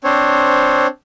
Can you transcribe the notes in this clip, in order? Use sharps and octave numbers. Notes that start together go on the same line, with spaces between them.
C4 D4 C5 C#5